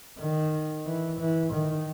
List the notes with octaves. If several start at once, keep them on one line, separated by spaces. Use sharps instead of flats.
D#3
E3
E3
D#3